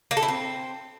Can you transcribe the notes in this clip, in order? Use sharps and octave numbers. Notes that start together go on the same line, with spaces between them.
A#3
A4
E4
C4